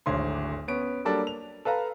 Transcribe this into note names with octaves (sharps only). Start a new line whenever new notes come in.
D1 G#1 D2 C#5 C6
B3 C#4 D7
F#3 G3 A#3 D4 A4
F7
A4 B4 F5 A#5